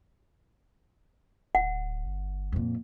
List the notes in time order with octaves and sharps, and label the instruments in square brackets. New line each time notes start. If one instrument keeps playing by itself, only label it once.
[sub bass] D1 [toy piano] F#5
[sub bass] G1
[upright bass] F2 A#2